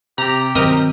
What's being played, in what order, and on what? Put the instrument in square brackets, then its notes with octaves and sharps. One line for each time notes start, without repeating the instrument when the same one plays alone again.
[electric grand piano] C3 [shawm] G4 [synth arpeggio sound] A#5
[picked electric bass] G2 D#3 F#3 [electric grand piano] C4 [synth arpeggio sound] A#4 D#5